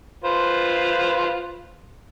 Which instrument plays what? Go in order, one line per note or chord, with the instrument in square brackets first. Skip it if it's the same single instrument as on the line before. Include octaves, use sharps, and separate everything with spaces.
[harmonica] F4 B4 C5